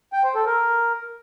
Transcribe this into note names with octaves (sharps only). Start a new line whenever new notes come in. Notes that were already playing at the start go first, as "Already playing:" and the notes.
G5
C5
A4
A#4